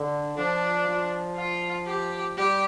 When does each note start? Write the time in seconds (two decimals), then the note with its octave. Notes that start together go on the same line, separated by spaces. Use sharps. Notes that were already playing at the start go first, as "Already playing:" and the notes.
Already playing: D3
0.38 F3 D4
0.88 F3
1.37 F4
1.87 G4
2.37 G3 G4